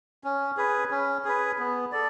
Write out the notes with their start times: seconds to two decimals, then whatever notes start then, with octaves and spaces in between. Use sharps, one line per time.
0.24 C#4
0.57 G#4 B4
0.91 C#4
1.25 G#4 B4
1.58 B3
1.92 A4 D5